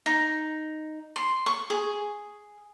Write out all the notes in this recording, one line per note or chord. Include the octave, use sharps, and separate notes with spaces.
D#4
C6
C#6
G#4